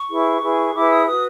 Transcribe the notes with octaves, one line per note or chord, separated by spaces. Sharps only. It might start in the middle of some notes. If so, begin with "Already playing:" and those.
Already playing: C#6
E4 G#4 B4
E4 G#4 B4
E4 G#4 B4 D6
D#6
F#4 B4 D#6